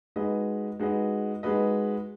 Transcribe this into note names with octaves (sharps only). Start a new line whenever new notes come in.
G#3 D#4 F#4 B4 D#5
G#3 D#4 F#4 B4 D#5
G#3 D#4 F#4 B4 D#5